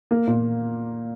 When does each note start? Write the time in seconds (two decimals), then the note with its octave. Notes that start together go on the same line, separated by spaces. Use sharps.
0.11 A#3
0.27 A#2